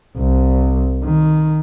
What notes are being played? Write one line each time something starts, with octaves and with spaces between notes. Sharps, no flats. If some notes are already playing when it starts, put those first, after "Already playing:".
C2
D#3